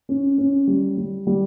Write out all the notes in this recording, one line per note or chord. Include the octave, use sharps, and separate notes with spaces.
C#4
C#4
G3
G3
G3